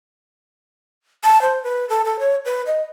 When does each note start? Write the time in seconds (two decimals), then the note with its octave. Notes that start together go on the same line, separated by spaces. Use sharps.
1.24 A5
1.42 C5
1.64 B4
1.89 A4
2.05 A4
2.19 C#5
2.45 B4
2.67 D#5